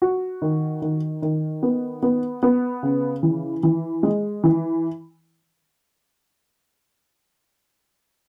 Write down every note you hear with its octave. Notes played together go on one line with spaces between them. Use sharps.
F#4
D#3
D#3
D#3
B3
B3
B3
C#3
E3
E3
G#3
E3